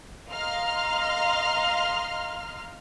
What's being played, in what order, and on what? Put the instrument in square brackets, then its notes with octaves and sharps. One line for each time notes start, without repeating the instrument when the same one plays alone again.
[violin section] D#5 F5 A#5 C6 F6